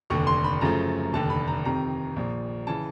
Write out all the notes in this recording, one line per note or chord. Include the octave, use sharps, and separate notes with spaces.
F1 D#2 D3 C#6
C6
B5
F#2 C#3 F3 A3 A#5
F1 D#2 D3 A5
B5
A#5
F2 C3 D#3 A#5
A#1 A#2 F3
C#3 E3 A5